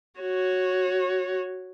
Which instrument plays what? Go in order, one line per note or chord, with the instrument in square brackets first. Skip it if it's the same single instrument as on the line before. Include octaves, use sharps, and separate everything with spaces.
[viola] F#4 C#5